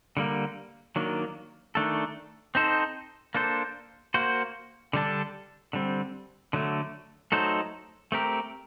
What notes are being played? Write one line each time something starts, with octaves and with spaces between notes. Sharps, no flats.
D3 G3 A#3
D#3 F#3 A#3 D4
D#3 A3 D4 A4
C4 D#4 A4 C5
A#3 D4 A4 C5
A#3 F#4 C5
D3 G3 D4 A4
D3 G3 C4
D3 F#3 A3
F#3 A3 D#4 A4 C5
A3 C4 G4 A#4